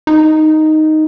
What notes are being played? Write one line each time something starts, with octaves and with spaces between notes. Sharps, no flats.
D#4